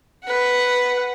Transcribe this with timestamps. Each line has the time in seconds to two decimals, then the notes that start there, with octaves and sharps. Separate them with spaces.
0.24 B4 F#5